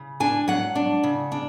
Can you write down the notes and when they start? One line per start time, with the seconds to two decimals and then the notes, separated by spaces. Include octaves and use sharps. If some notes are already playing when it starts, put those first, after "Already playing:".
Already playing: C#3
0.20 D4 G#5
0.48 F#3 F#5
0.75 D4
1.04 C#3
1.32 D4